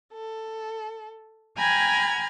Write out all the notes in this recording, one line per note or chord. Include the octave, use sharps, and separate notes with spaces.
A4
G5 G#5 A#5 B5 F6 G#6